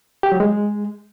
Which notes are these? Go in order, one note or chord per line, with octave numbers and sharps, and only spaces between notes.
G4
F#3
G#3